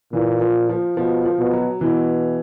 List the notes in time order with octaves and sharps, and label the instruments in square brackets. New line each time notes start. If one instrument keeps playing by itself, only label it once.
[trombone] A#2 [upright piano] E3
[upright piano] F3
F3
[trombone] B2 [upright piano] F3
[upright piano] F3
[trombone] B2
[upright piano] F#3
[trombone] B2 [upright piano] E3